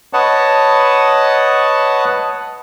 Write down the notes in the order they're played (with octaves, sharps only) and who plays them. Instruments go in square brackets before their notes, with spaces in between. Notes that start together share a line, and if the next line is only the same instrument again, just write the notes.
[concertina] B4 C#5 D#5 F#5 A5